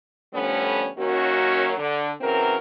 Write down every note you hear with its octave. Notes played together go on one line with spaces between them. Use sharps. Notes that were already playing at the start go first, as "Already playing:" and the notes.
D3 F3 G3 A3 B3 C#4
F#2 D#3 F#3 A#3 C#4 F#4
D3
C#3 E3 F#3 C4 A#4